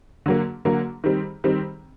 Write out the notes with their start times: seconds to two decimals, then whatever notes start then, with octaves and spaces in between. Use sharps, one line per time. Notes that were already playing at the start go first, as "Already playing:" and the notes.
0.26 D3 F#3 A#3
0.65 D3 F#3 A#3
1.04 D#3 G3 C4
1.44 D#3 G3 C4